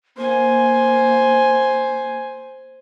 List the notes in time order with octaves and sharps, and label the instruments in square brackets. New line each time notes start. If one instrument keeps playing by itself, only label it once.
[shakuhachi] A#3 [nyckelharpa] C5 G#5